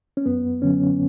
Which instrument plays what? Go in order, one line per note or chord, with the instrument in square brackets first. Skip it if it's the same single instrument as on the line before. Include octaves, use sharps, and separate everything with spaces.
[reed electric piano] C#4
F#2 B3
D3 F#3 C#4